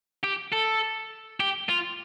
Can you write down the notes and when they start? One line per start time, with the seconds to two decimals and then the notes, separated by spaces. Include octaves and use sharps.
0.24 G4
0.53 A4
1.40 G4
1.69 F4